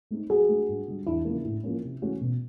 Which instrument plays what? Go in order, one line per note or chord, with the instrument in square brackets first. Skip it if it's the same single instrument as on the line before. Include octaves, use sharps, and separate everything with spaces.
[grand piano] A3 C4 D#4
[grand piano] F#3 [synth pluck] F#4 G#4
[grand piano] A3 D4
G2
D3 G3
[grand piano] E2 [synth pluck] D4 E4
[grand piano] C#3 F3 A#3
A2
F3 A#3 C#4
C3
E3 A3 C#4 F#4
B2